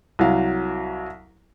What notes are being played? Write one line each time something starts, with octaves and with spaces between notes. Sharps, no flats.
C2 F#3 F5